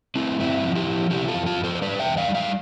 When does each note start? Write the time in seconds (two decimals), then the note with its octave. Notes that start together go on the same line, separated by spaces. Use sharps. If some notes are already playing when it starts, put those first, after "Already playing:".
0.15 A3 C4 E4
0.40 G2 C4 E4
0.64 F3
0.75 E4 G4
0.87 F3
1.11 C3 E4 G4
1.28 F4 A4
1.35 F2
1.46 F4 A4
1.58 F2
1.64 A4 C5
1.75 C5
1.82 G3 B4 D5
1.99 E5 G5
2.06 E2
2.17 D5 F5
2.29 G3
2.35 D5 F5